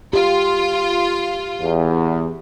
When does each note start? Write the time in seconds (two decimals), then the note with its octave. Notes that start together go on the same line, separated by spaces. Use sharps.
0.13 F4 G4
1.60 E2